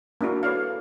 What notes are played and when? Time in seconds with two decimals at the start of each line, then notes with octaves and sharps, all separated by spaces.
0.21 A#3 D4 E4 F#4 A#4
0.43 A4 B4 C#5 D5 F5